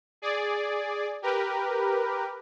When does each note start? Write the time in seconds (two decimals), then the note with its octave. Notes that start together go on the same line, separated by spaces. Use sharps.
0.22 G#4 D5
1.22 G4 A#4 B4